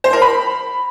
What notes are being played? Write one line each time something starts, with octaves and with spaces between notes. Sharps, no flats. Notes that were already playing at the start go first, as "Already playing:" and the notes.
C5
A#4
B5